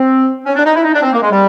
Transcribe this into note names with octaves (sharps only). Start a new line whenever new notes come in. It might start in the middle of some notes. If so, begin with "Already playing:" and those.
Already playing: C4
C#4
D4
D#4
E4
D#4
D4
C4
A#3
G#3
G3